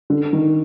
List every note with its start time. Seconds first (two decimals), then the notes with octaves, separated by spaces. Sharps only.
0.10 D3
0.33 D#3